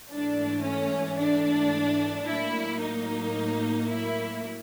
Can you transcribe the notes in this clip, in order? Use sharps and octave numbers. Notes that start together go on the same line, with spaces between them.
G#2 E3 A3 D4
C#4
D4
A2 F#3 A#3 E4
D#4
E4